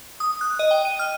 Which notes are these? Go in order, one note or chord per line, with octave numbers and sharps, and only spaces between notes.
D#6
F#6
D#5
G5
D#7
F6